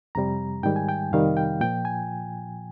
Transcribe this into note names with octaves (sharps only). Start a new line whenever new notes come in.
F2 C3 G3 A#5
G#2 D#3 G3 G5
G#5
G5
F2 C3 D#3 G3 F5
G5
A#2 F3 G5
G#5